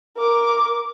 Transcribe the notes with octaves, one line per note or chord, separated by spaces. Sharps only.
A#4 D6